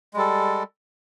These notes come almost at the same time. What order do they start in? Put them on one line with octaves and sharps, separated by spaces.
G#3 G3 A4